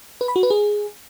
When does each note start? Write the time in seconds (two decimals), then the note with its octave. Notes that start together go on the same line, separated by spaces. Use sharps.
0.21 B4
0.28 B5
0.36 F#4
0.43 B4
0.50 G#4